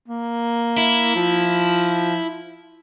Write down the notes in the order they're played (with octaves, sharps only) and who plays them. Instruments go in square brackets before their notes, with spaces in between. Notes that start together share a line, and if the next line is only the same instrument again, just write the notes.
[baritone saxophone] A#3
[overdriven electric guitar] E4
[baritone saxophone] F3